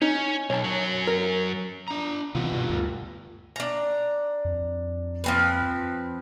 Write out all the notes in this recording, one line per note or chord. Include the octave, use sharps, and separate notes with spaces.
C#4 D#4
B1 C#5 A5
F#2 F#3
A#4
D4 A#5
C3 E3 B3 F4 B4
G2 B2
D2 G2
D4 A#5
F2
F3 C4 B4